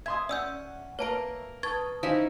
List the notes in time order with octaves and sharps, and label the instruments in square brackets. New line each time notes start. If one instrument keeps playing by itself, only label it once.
[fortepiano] E5 C6 D#6 [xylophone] G#6
[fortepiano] C#4 [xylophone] D5 E6 G6 [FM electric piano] E5 F#5
[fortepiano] A#3 A#4 [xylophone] B4 A5 D7 [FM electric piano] C#5 E5
[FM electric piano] B4 A5 D#6 [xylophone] C#6 G#6 A6
[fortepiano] C#4 [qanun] D#4 E4 [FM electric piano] C5 [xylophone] F5